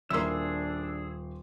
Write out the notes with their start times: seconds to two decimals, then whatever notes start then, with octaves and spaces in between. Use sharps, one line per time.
0.10 D#1 A#3 D4 E4 G#4 C6 E6